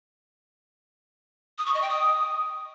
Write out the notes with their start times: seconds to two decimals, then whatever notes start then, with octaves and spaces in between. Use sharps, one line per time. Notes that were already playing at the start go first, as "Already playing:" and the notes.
1.58 D#6
1.66 C#6
1.74 D#5
1.82 G5
1.90 D#6